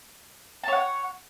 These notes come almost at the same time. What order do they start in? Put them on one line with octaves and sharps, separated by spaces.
A5 C#5 F#5